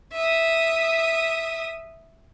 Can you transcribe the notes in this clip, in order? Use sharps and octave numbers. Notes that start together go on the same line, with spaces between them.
E5 D#6